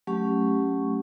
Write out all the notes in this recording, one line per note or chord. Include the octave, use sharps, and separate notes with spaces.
F#3 A3 C#4 G4 C#6